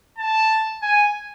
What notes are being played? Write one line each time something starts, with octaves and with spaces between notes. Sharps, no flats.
A5
G#5